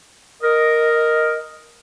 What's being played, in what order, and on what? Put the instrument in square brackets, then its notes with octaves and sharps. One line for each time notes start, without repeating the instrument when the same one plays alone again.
[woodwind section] A#4 D#5